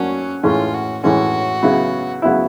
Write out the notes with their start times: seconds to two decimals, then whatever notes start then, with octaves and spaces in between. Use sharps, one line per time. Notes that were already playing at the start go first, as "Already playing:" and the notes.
Already playing: F#3 A#3 C#4 D4
0.43 A2 E3 G#3 C#4 F4
0.74 F#4
1.03 A2 E3 G#3 C#4 F#4
1.62 C#3 F#3 B3 E4
2.22 C#3 F#3 B3 E4